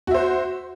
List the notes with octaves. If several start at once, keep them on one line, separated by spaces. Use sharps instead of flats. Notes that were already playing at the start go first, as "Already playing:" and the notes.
F#4 C5 E5